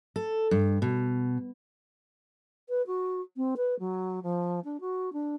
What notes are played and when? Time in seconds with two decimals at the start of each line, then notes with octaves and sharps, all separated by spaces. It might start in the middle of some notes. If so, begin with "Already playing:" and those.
0.16 A4
0.51 G2
0.82 B2
2.69 B4
2.87 F#4
3.37 C4
3.57 B4
3.79 F#3
4.23 F3
4.64 D4
4.80 F#4
5.13 D4